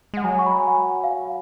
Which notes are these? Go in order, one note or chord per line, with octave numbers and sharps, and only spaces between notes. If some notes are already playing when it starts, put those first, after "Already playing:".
G#3 F#5
F#3 G#5
C#6
B5
A#5
G#5
F#5
F5
F#5